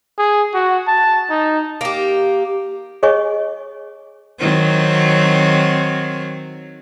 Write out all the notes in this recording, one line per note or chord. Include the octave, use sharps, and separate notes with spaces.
G#4
F#4
A5
D#4
A#3 G4
G#4 C#5 D#5 G#5 C#6
D#3 F#3 C4